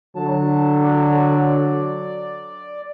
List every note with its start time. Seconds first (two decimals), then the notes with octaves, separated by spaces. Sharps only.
0.16 D3 F#3 A5
0.83 D5